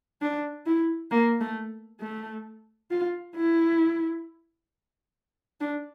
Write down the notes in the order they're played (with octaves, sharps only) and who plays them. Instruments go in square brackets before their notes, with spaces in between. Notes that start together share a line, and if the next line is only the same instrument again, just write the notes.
[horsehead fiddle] D4
E4
A#3
A3
A3
F4
E4
D4